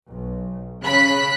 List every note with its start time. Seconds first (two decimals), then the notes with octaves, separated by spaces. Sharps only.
0.10 B1
0.85 C#3 B5 F#6 B6